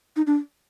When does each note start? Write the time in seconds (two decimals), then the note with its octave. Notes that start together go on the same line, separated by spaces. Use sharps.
0.16 D#4
0.27 D4